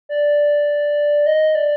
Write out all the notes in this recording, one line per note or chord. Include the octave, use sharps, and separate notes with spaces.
D5
D#5
D5